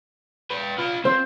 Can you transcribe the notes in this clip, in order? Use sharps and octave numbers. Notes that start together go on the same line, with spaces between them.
B4 G5
F4 B5
C4 C5